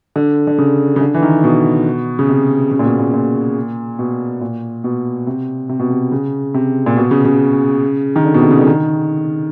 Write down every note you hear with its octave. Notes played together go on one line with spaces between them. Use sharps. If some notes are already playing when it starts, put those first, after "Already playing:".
D3
D3
C#3
C#3
D3
E3
D#3
B2
C#3
C3
C#3
A#2
B2
A#2
A#2
B2
A#2
B2
C3
C3
B2
C3
C#3
C3
A#2
B2
C#3
C#3
D#3
D3
B2
C3
C#3
D3
D#3